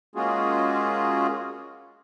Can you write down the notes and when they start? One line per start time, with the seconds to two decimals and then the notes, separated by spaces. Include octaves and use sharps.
0.15 G#3 A#3 C#4 F4 F#4 G#4